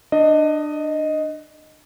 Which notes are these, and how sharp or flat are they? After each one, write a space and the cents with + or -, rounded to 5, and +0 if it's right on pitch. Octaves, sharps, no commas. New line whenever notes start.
D4 +25 D#5 +0